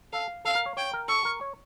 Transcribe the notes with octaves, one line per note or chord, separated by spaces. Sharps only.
A4 F5
A4 F5
A#4
C#5
C#5 G5
A#4
A4 C#6
A#4
C#5